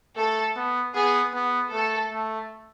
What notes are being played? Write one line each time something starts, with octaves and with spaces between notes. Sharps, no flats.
A3 A4
B3
B3 G#4
B3
A3 A4
A3